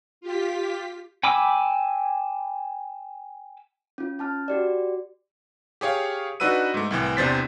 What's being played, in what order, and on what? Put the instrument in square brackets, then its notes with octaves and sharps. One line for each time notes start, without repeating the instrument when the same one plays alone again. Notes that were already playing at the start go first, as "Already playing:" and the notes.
[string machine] F4 G4 B6
[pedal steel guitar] G5 G#5 B5 D6 E6
[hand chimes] C#4 F4
C#4 A5 F6
F#4 G4 D5
[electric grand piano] G4 G#4 C#5 F5
D4 D#4 F#4 B4 E6 D#7
G#2 A3
C2 A2 E3
E2 C3 D4 C5 A6 B6